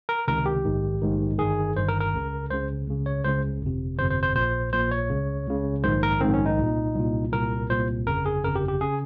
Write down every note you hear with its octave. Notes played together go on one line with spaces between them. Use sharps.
A#4
C#2 C3 D#3 A#4
G4
A#1 G#2 D#3
A#1 G#2 D#3
G1 G2 D#3 G#4
G1 G2 D#3 C5
A#4
A#4
C#2 C#3
C#2 C#3 C5
C#2 C#3
C#5
C#2 C#3 C5
G1 F2 C3
G1 F2 C3 C5
C5
C5
A#1 A#2 C5
A#1 A#2 C5
C#5
C#2 C#3
C#2 C#3
A#1 G#2 D#3 C5
A#4
A#1 G#2 D#3 C4
C#4
D#4
C2 A#2
C2 A#2
C2 A#2 A#4
C2 A#2 C5
G1 F2 C#3 A#4
G#4
G1 F2 C#3 A#4
G4
G4
C#3 G#4